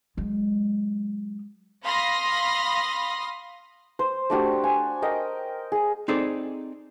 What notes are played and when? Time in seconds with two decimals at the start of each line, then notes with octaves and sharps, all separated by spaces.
0.17 F#3 G#3
1.84 F5 B5 C6 D#6 A#6
3.99 C5
4.30 A3 D4 F#4 G4
4.64 G#5
5.02 A#4 D#5 G5
5.72 G#4
6.08 C4 D#4 G#4 A4 D5